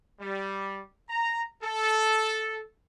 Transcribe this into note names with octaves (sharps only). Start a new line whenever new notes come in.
G3
A#5
A4